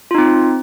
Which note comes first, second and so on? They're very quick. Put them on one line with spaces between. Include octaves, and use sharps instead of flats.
F4 D#4 C4